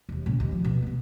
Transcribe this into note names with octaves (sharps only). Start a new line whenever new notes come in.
E1 D#2
A#2 C#3
D#2
F3
C2 B2
A3 B3